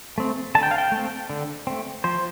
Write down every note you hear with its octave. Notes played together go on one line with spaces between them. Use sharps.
A3 C4
D3 A5
G5
F5
G5
A3
C4
D3
A3 C4
F3 C5